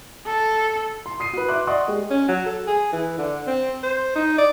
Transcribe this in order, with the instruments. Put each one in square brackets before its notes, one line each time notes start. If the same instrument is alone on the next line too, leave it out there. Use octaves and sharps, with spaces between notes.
[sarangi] A4
[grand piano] C6
D#6 C7 D#7
F#4 B4
E5 C6 D6 F#6
D5 D#5 F#5 C6 C#6 D#6
G#3 G4
[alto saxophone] C#4
F#3
A4
G#4
E3
D3
C4
C5
D#4
D5